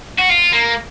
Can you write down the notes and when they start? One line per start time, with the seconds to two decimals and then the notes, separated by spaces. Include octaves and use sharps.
0.18 F#4
0.29 F4
0.53 A#3